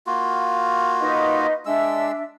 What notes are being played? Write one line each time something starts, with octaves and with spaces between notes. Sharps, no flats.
A#3 F4 F#4
D#4 B4 D#5
G#3 D4 E5 E6